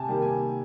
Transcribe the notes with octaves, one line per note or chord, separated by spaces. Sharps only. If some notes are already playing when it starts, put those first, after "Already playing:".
Already playing: C3 G#5 A5
D#3 G3 A#3
G#5